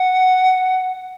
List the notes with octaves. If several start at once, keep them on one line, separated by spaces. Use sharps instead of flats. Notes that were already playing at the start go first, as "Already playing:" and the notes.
Already playing: F#5